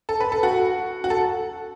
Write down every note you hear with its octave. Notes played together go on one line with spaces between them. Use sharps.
A4
B4
A4
F#4
F#4
A4